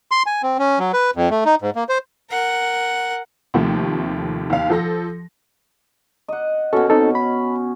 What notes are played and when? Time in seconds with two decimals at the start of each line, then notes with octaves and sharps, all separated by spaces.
0.12 C6
0.26 G#5
0.43 C4
0.59 C#4
0.79 F#3
0.93 B4
1.16 F2
1.30 A3
1.45 D#4
1.62 G#2
1.76 A#3
1.89 C5
2.31 A#4 F#5
3.54 D#2 C3 F3 A3
4.50 D#2 F5
4.70 F3 A4 A#6
6.28 D#5 F#5
6.73 B2 C#4 F#4 A4
6.90 C4 D#4 A4
7.15 B5